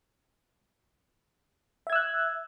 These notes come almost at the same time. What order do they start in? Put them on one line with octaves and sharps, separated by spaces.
E5 G#6 E6 F#6